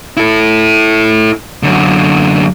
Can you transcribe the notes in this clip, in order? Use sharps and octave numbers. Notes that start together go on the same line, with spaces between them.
E4 A4
F#2 D3